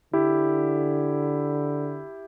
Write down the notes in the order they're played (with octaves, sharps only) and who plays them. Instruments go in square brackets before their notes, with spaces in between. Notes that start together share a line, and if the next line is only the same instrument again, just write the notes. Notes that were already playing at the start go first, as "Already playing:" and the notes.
[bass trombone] D3 [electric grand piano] E4 G4